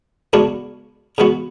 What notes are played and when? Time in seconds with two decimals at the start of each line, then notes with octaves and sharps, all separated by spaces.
0.33 C#3 G#3 B3 D4 F#4
1.18 C#3 G#3 B3 F#4